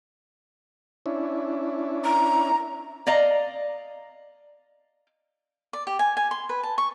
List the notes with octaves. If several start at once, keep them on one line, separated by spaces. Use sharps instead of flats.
C#4 D4 E4
A#5
D5 D#5 F5 A#5
D5
G4
G#5
G#5
C6
B4
A5
C#6